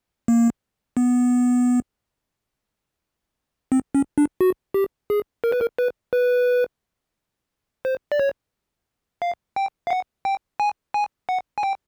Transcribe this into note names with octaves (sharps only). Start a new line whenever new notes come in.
A#3
B3
C4
C#4
D4
F#4
G4
G#4
A#4
B4
A#4
B4
B4
C5
D5
C#5
F5
G5
F5
F#5
G5
G#5
G#5
F#5
G#5
G5